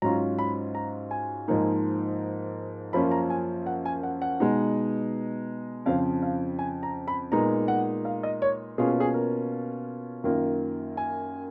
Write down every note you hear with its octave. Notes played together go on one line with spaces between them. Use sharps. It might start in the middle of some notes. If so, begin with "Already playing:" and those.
G#2 F#3 C#4 F4 A#5
B5
A#5
G#5
G#2 F3 A#3 D#4
F#2 F3 A#3 C#4 F4 B5
A#5
G#5
F#5
G#5
F#5
F#5
B2 G#3 B3 D#4
F2 C#3 F3 F5
F5
G#5
A#5
B5
A#2 G#3 B3 D#4 A#5
F#5
F5
D#5
C#5
B2 A#3 C#4 F4 G#4
A#4
G#4
A#4
F#2 D#3 A#3 F4
G#5